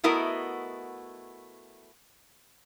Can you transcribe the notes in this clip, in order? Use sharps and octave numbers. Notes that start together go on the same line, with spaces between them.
A3 B3 E4 F#4 A#4 D#5